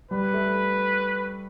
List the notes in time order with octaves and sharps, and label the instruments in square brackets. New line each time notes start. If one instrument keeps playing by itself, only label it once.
[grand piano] G3 [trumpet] B4
[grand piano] A3